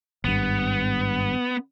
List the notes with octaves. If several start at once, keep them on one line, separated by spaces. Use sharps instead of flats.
G#1 G2 B3